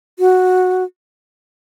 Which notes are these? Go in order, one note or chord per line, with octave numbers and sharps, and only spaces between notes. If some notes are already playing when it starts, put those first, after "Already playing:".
F#4